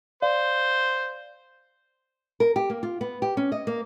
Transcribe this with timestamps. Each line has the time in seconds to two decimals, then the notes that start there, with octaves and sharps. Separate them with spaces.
0.22 C5 D5 F5
2.40 A#4
2.56 G4
2.70 A#3
2.83 F4
3.01 B3
3.22 G4
3.37 C#4
3.52 D#5
3.67 A#3